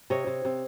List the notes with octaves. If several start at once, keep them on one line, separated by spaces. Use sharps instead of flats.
C3 C#5 D#5
C3
C3